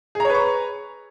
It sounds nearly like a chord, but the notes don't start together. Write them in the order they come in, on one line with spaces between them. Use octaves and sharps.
G#4 A#5 C#5 B4 C#6